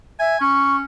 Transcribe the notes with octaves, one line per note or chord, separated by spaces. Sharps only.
E5 G#5
C#4 C#6